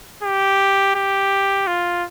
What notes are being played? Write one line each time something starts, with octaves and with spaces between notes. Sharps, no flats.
G4
G4
F4